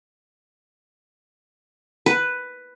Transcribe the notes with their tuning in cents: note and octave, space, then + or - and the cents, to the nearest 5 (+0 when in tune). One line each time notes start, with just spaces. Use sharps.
B4 +5